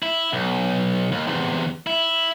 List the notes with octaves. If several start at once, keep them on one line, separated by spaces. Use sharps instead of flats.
E4
B1
D#2
E2 C3
E4